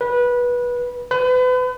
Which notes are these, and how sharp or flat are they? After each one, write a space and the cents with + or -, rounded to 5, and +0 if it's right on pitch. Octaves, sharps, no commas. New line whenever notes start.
B4 -20
B4 +35